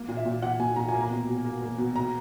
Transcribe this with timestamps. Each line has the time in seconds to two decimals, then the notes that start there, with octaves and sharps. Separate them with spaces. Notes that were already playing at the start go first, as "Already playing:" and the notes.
Already playing: A#3
0.08 A#2
0.17 E5
0.25 A#2
0.42 A#2 F#5
0.60 A#2 G#5
0.76 A#2 A#5
0.89 G#5
0.94 A#3
1.01 A#5
1.10 B2
1.27 B2
1.45 A#3
1.62 A#3
1.78 B2
1.96 A#5